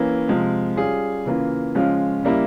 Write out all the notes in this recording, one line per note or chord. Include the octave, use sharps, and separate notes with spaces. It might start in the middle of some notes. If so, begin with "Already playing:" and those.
Already playing: E3 A#3 C#4
C3 F3 G#3
G3 C#4 F4 G#4
C#3 E3 A#3 F4
C#3 F3 G#3 C#4 F4
C#3 G3 A#3 E4